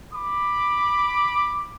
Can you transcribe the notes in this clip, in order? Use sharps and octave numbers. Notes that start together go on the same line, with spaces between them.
B5 D6